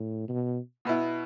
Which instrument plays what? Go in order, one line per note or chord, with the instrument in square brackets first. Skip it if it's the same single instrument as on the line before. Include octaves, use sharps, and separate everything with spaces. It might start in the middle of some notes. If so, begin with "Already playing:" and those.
Already playing: [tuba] A2
B2
[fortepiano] B2 B3 E4